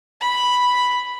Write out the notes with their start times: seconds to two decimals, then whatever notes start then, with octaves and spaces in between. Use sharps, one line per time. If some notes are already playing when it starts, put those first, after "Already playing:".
0.20 B5